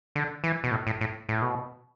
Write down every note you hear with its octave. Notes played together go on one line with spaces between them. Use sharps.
D3
E3
B2
A2
A2
A2
A2
B2